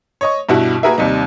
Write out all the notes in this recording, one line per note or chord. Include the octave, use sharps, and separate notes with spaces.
C#5 D#5 C#6
G2 B2 E4 F#4
A#3 F#4 G#4 A#4 B4 E5
D#2 C3 G3 D#4